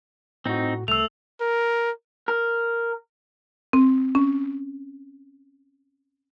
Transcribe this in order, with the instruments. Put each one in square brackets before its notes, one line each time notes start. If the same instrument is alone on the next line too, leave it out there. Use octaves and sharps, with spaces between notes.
[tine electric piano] A2 F#4 [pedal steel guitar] C4 D#4
[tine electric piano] C2 [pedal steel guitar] A3 [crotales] E6 F7
[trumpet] A#4
[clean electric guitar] A#4
[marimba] C4
C#4